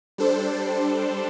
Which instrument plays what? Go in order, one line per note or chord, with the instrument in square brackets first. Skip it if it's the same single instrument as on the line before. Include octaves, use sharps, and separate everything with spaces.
[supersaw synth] G3 D4 A4 C5